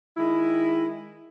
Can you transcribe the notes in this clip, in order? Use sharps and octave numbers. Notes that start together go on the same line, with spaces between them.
D#3 G#3 E4